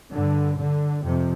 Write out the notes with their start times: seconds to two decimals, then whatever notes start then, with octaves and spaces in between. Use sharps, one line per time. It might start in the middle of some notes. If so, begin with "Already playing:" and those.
0.12 G2 D3
0.58 D3
1.04 F2 C3 F3